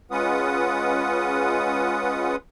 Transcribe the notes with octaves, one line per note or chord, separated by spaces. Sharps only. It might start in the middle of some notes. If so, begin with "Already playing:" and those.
G#3 C#4 F4 B4 F#5 D#6